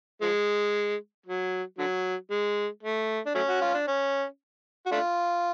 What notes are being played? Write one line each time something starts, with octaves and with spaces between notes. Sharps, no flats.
F3 G#3
F#3
D3 F#3
G#3
A3
D4
F#3 A3 C#4
F#4
F4
D4
C#4
F#4
A3 D4 F4